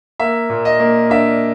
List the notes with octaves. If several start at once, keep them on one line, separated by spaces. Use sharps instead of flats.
A#3 E5
A#2
D#5
A#3
D4 E5